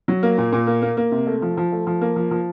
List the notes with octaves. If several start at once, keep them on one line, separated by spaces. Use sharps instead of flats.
F#3
A#3
A#2
A#2
A#3
A#3
A#3
C3
A3
F3
F3
A3
F3
A#3
F3
F3